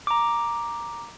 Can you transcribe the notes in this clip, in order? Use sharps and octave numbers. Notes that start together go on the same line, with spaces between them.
A#5 D6